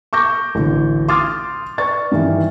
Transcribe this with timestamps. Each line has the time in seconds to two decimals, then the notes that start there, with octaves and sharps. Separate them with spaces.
0.13 C#6 D6 G6 A#6
0.55 A1 D2
1.08 C6 D6 D#6 F6 A6
1.78 B4 D5 C#6 A6
2.12 G2 D#3 E3